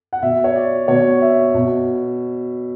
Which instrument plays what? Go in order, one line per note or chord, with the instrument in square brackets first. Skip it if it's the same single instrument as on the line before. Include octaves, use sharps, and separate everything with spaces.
[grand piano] F#5
B2 E5
C#5
D5
B2 C#5
E5
B2